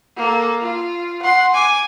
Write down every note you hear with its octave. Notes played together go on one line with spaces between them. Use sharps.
A#3 A4
F4
F#5 C6
G#5 D6